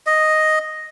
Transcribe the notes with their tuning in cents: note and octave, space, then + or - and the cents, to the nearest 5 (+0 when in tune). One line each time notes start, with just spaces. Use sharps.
D#5 +0